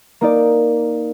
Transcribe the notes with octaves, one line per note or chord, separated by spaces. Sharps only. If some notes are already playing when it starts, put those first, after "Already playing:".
A#3 D#4 D5